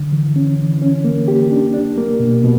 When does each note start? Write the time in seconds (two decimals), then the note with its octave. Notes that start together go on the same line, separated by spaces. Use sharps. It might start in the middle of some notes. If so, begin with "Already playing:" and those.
Already playing: D3
0.12 E3
0.36 C#4
0.59 E3
0.82 C#4
1.05 A#3
1.28 G4
1.51 D4
1.74 D4
1.98 A#3
2.20 B2
2.44 B2